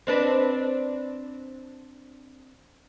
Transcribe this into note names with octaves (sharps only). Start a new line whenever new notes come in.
C4 D4 B4